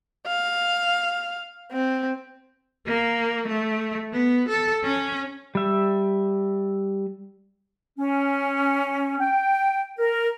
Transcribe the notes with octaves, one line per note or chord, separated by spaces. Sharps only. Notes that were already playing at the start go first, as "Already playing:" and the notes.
F5
C4
A#3
A3
B3
A4
C#4
G3 E5
C#4
G5
A#4